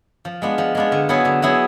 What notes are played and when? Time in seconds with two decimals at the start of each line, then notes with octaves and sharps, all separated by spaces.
0.25 F3
0.42 G#3 B3 D4 F4
0.58 F3
0.75 G#3 B3 D4 F4
0.92 D3
1.09 F#3 B3 E4 G#4
1.25 D3
1.42 F#3 B3 E4 G#4